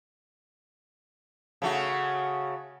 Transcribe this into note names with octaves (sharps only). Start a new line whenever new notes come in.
C#3 A3 F#4